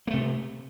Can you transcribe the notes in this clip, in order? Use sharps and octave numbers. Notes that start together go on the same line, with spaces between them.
C3 A3 A#3